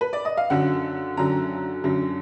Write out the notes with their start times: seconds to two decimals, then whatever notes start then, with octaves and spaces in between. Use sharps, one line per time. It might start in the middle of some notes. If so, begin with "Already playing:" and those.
0.01 B4
0.13 D5
0.25 D#5
0.37 F5
0.50 F#2 D3 F#3 F#5
1.17 F#2 D3 F#3 A#5
1.84 F#2 D3 F#3